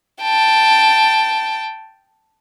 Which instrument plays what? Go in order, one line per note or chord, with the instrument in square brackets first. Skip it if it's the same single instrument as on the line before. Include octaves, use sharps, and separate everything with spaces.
[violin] G5 A5